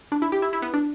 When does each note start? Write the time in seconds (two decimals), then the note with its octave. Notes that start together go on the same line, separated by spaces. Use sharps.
0.12 D4
0.22 E4
0.32 G4
0.42 E4
0.53 E4
0.62 B3
0.74 D4